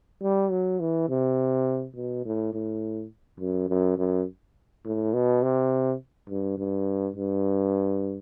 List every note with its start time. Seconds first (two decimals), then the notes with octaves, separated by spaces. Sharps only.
0.23 G3
0.51 F#3
0.80 E3
1.09 C3
1.96 B2
2.25 A2
2.53 A2
3.40 F#2
3.69 F#2
3.98 F#2
4.85 A2
5.13 B2
5.42 C3
6.30 G2
6.58 G2
7.16 G2